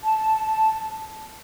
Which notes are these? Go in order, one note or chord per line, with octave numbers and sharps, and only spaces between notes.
A5